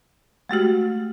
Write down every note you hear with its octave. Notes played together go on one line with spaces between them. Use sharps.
G#3 A3 F#4 G4